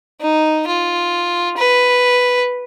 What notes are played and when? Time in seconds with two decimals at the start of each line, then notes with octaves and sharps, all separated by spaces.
0.21 D#4
0.67 F4
1.58 B4